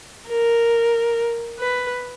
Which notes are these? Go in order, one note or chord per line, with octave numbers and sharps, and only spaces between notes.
A#4
B4